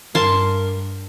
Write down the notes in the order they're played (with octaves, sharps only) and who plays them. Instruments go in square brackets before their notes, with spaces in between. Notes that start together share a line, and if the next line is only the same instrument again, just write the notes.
[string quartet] G2 [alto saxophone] A#4 [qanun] A5 C6